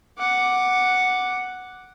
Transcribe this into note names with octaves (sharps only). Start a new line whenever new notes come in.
F#5 D6